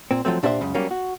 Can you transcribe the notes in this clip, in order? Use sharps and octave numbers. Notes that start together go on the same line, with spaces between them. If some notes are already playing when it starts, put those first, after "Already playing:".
A#2 C4
F3 F#3 A3 C4
A#2 D4 G4 C5 E5
C#2 F#2 C#3
F#3 G3 A#3 C#4
F#4